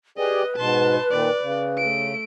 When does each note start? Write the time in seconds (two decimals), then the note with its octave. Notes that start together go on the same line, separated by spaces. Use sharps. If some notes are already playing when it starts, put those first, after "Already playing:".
0.18 G4 G#4 B4 D5 D#5
0.57 G#2 B2 A5 C6
1.11 A#2 D#3 D5
1.42 C#3
1.78 A3 D7